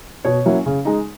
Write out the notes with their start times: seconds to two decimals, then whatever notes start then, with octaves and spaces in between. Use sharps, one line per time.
0.25 B2 C#5
0.46 F#3 A#3 C#4 E4
0.66 C#3
0.85 G#3 D#4